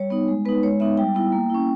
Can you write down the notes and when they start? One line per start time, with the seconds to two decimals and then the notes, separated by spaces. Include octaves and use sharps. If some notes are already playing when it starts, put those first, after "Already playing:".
Already playing: G3 C#5
0.10 B3 D#4
0.28 G#3
0.45 B3 D#4 B4
0.63 G#3 C#5
0.80 B3 D#4 E5
0.98 G3 G5
1.15 B3 E4
1.32 A#3
1.50 C#4 E4